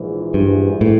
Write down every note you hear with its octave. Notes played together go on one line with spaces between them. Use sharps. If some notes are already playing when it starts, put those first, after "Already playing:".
Already playing: A#1 G#2 E3
G2
A2